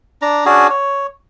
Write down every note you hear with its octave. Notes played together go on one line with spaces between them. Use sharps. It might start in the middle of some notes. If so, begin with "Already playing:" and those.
D4 A#5
C#4 D4 F#4 G#4
C#5